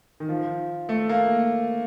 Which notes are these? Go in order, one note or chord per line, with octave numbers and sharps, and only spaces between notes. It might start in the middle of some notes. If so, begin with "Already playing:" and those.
D#3
F3
A3
A#3